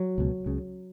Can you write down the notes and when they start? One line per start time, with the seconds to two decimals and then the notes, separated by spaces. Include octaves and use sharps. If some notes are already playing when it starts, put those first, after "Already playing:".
Already playing: F#3
0.18 C#2 B2
0.46 C#2 C#3